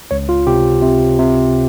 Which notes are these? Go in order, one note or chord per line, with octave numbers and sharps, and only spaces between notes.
C#2 C#5
F4
C3 G4
C3
C3